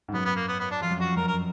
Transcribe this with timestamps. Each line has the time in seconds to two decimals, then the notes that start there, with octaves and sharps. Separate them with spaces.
0.08 G#2
0.13 F#2 B3
0.25 B3
0.36 A#3
0.48 B3
0.60 B3
0.71 D4
0.82 F2 F4
0.91 F#2
0.99 F2 F#4
1.17 F#2 A#4
1.28 A#4